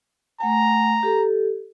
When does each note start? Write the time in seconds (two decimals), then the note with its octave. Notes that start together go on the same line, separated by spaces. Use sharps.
0.40 A3 F#5 G#5 A#5
1.03 G4 A4